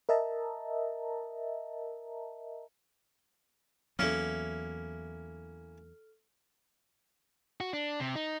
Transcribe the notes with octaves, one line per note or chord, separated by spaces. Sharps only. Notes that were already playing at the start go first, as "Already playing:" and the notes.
A#4 D#5 E5 A5 A#5
E2 F#3 A#3 C#4 E4 A4 F6
F#4
D4
C3
D#4